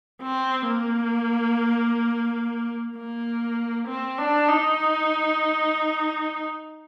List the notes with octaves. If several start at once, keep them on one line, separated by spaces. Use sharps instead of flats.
C4
A#3
A#3
C4
D4
D#4